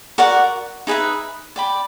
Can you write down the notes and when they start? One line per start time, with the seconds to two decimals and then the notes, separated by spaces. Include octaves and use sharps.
0.18 F#4 A#4 D5 F#5
0.87 D#4 G#4 B4 E5
1.56 D5 G5 B5